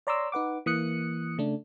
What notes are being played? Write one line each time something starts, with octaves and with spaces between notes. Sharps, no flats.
C#5 D5 A#5 C6 D6 E6
D#4 B4 F#5 D6
E3 A#3 D#6 F#6 C#7
C#3 A3 D4